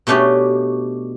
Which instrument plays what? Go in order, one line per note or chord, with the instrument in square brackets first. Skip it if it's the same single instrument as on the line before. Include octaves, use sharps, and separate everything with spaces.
[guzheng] B2 A3 C#4 D4 G4